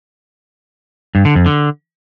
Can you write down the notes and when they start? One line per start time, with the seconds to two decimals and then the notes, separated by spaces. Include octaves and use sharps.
1.15 G2
1.25 D3
1.35 F2
1.46 D3